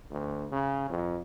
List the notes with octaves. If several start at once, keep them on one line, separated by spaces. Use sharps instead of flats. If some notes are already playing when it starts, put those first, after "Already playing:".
D2
C#3
F2